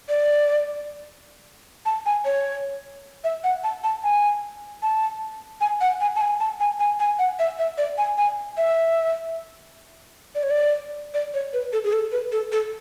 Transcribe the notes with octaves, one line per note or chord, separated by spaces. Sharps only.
D5
A5
G#5
C#5
E5
F#5
A5
A5
G#5
A5
G#5
F#5
G#5
A5
G#5
A5
G#5
G#5
G#5
F#5
E5
E5
D5
G#5
G#5
E5
D5
C#5
D5
D5
C#5
B4
A4
G#4
A4
B4
A4
A4